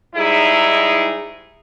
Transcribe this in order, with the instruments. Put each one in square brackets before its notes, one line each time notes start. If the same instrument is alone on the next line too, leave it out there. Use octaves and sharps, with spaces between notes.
[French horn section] G#2 G3 D#4 E4 G#4